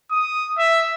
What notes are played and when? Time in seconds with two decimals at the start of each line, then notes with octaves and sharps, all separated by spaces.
0.11 D#6
0.58 E5